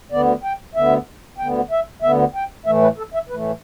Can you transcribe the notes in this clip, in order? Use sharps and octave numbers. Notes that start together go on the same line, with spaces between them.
D2 D3 B3 D5
G5
D2 D3 B3 E5
D2 D3 B3 G5
E5
D2 D3 B3 E5
G5
A2 E3 A3 E5
B4
A4
E5
A2 E3 A3 B4